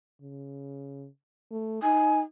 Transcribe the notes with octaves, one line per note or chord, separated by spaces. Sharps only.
C#3
A3
D#4 G#5